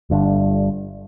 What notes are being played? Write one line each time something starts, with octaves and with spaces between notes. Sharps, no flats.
G1 G2 D3